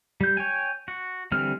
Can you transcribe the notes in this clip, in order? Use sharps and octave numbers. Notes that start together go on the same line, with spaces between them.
G3 G6
C#5 G5 G#5
F#4
D3 E3 G3 C4 F6